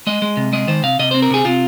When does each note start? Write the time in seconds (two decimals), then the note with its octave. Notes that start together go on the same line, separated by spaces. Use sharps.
0.07 G#3 D#5
0.22 G#3
0.37 C3
0.53 G#3 D#5
0.68 D#3 C5
0.83 C3 F5
0.99 C3 D#5
1.11 C4 C5
1.22 A#4
1.31 C3 G#4
1.45 C3 F4